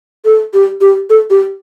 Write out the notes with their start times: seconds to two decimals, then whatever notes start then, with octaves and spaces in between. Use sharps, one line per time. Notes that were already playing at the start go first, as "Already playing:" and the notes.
0.25 A4
0.54 G4
0.81 G4
1.10 A4
1.30 G4